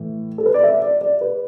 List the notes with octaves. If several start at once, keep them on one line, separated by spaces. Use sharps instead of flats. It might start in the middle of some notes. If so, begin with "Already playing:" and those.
Already playing: A2 E3
A4
B4
D5
E5
D5
D5
B4